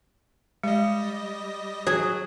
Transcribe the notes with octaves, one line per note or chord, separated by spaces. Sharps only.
G3 G#3 D#5
F#3 G#4